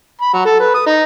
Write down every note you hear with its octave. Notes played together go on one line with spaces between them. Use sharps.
B5
F#3
A4
B4
D#6
D#4